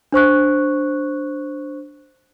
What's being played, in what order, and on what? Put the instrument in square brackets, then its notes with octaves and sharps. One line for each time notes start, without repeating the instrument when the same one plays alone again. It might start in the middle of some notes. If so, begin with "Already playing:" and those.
[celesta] D4 C5 C#6 F#6